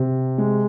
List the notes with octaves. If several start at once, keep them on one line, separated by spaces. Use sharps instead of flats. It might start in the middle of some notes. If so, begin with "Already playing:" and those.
Already playing: C3
G#3